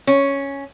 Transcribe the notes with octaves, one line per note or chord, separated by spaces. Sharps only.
C#4